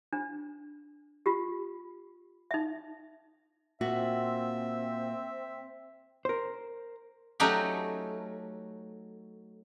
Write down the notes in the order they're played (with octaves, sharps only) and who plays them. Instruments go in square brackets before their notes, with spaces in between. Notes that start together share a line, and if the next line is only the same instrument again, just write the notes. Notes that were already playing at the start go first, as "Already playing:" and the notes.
[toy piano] D4
F4 G4
D#4 E5
[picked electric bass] A#2 [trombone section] C4 [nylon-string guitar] F#4 [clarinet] E5
[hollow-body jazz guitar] A#4 C5
[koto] F#3 A3 C#4 D#4 F#4 G4